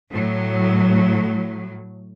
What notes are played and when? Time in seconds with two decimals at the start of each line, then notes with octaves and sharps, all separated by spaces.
0.12 A2 F#3